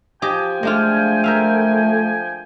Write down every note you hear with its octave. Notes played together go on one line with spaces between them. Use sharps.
F3 G4 D#5 G5 G#5
G#3 A3 D4 F4
A#4 E5 F5